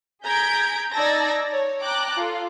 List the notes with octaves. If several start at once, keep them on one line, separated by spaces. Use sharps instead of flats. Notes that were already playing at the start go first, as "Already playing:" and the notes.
G#4 A#5 G6 G#6 B6 D7
D#4 D5 A5 E6 G#6 A#6
C#5
G5 A5 A#5 D6 F#6
F4 A4